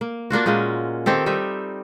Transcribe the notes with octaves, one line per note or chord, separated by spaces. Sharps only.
A#3
A#3 D4 F4 F#4
A#2 G#3 A#3 C#4
D#3 C4 G4 A4
G3 C4 D#4 E5